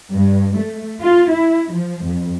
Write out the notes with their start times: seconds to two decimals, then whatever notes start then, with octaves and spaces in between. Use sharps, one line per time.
0.13 G2
0.58 A3
1.02 F4
1.32 E4
1.71 F3
2.05 F2